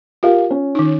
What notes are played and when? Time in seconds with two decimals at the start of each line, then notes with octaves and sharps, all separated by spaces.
0.23 F4 G4 A#4 F5
0.50 C#4
0.75 D#3 D#4